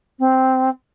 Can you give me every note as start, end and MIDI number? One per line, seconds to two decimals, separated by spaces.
0.19 0.69 60